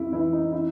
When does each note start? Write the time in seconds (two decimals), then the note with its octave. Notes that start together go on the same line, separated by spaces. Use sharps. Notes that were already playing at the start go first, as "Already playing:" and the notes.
Already playing: F2 E4
0.12 E3 E4
0.33 D#4
0.52 E4